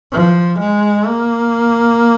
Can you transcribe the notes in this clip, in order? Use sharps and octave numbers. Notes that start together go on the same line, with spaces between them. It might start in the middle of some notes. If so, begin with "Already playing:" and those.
F3
G#3
A#3